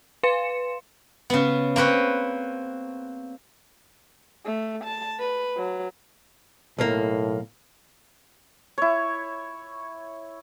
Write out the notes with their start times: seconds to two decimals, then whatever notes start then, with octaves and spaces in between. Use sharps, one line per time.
0.23 B4 F5 C6 C#7 E7
1.30 C#3 B3
1.76 A#3 C4 B4 C#5
4.46 A3
4.84 A5
5.20 B4
5.58 F#3
6.78 B1 A2 A#3
8.78 E4 C#5